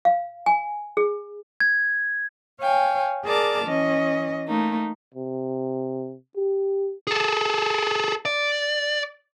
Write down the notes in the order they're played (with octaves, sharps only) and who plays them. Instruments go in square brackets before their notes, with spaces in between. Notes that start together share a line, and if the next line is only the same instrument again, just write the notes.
[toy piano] F5
G#5
G#4
[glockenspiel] G#6
[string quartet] C#5 F5 G5 G#5
G#4 A#4 D5 A5 D6 F6
E3 C#4 D#5
A3 A#3 D#4
[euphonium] C3
G4
[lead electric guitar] G#4 A4
D5